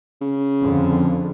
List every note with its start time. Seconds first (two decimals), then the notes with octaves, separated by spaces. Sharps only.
0.21 C#3
0.62 F2 D3